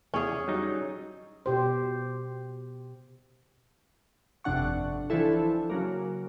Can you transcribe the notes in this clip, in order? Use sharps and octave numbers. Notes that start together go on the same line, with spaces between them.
E2 C#4 G#4 D5
F#3 G3 D#4
B2 G4 C5
G1 F2 C3 D4 F#5 C#6
E3 F3 C4 D4 E4 A4
C#3 F#3 A#3